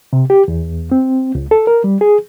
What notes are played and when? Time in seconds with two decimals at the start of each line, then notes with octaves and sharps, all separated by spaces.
0.13 C3
0.30 G4
0.48 E2
0.92 C4
1.35 C#2
1.51 A4
1.67 A#4
1.84 G3
2.01 G#4